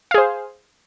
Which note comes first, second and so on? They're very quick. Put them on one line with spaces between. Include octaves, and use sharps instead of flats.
F5 G#4 C5